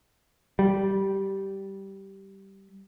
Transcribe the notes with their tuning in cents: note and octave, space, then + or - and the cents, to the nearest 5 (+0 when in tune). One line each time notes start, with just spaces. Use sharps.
G3 -10